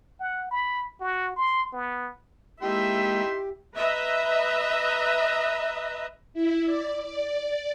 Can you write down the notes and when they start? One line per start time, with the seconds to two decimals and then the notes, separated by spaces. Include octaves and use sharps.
0.20 F#5
0.51 B5
1.01 F#4
1.36 C6
1.73 B3
2.62 G#3 A#3 D#4 E4 G4 E5 G5 C6
3.76 B4 D#5 E5 A#5
6.34 E4
6.65 D5
7.03 D5